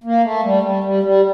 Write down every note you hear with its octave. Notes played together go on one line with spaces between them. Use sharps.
A#3
A3
G3
G3
G3
G3